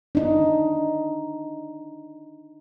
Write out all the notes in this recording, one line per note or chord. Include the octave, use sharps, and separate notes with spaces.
D4 D#4